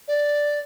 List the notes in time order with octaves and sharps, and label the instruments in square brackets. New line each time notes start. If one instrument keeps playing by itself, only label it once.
[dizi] D5